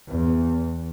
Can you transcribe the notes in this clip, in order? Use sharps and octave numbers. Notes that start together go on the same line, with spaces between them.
E2